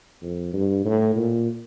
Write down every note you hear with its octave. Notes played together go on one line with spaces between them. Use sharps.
F2
G2
A2
A#2